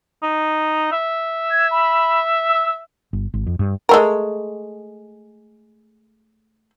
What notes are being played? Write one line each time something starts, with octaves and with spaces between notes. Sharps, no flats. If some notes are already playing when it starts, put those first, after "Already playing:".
D#4
E5
G#6
B5
E6
G1
G#1
F2
G2
G#3 A3 A#4